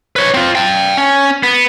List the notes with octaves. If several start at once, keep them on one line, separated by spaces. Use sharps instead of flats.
B4 C#5
C4 F4
G5 A5
C#4
B3